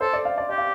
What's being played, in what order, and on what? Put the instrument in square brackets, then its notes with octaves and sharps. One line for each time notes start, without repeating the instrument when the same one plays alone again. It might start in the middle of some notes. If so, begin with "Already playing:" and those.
[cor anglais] A4 [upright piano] C5
[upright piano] D5
F5
D5
[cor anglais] G4 [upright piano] D5
[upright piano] F5